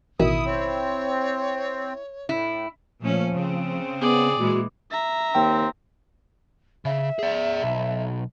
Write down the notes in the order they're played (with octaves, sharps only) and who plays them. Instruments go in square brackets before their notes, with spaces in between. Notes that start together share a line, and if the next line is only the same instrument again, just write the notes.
[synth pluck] A1 B2 D#3 [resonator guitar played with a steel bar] E4 [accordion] D#6
[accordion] C4 [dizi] C#5
[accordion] A2 [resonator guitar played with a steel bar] E4
[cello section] A#2 A3 C#4 [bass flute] F3
[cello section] C#3 C4
[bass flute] B3 [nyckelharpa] G#4 D5
[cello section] A#2 E3 G#3 [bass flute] F#4
[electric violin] E5 A#5
[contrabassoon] D#2 [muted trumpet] C4 [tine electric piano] G5
[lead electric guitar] C#3 [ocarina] E5
[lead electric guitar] G#4 D5
B1